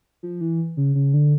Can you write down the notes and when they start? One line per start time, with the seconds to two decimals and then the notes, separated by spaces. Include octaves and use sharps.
0.23 F3
0.41 E3
0.77 C#3
0.95 C#3
1.14 D3